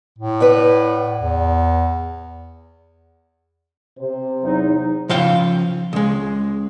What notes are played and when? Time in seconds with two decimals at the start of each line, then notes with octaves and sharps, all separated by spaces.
0.19 A2
0.40 B4 D5 F#5
1.21 E2
3.99 C3 C5
4.43 E2 F#3 D#4
5.09 C#3 F3 F5 G5
5.93 C#2 G#3